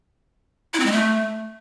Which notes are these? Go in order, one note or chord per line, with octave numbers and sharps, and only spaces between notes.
E4
C4
G#3
A3